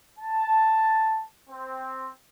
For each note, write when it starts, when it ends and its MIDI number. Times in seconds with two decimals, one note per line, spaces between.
0.19 1.23 81
1.50 2.09 60